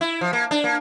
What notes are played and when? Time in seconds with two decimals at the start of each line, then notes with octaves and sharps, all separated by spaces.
0.01 E4
0.21 F3
0.33 A#3
0.51 D4
0.64 A#3